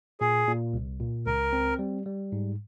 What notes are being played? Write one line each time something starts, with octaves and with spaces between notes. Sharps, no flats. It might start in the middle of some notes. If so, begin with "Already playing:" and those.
A#2 G#4
A#2
C2
A#2
C#2 A#4
C4
G3
G3
G#2